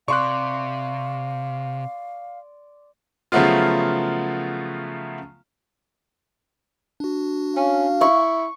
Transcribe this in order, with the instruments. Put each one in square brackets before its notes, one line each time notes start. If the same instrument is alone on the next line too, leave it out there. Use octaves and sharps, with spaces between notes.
[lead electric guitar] C3 [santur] D5 C6 [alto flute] F5 [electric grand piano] C#6 F#6
[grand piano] C#3 F3 F#3 A3 B3 F4
[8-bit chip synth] D4 F#4
[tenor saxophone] C#4 [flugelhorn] F5
[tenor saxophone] E4 [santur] C#6